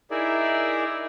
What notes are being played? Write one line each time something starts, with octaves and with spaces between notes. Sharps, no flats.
D#4 E4 G#4 A#4 D5 E5